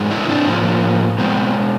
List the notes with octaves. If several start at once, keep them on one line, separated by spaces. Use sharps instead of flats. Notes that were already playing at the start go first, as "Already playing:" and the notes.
Already playing: G#2 E3 G#3
D4 E4
C4 D4
A2 F3 A#3
B2 G#3 B3 C4